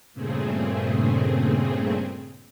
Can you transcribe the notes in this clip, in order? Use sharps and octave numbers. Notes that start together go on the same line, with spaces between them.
G2 A#2 C#3 A3 C4 G#4